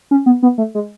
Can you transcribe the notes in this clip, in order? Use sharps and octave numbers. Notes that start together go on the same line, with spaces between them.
C#4
B3
B3
A3
G#3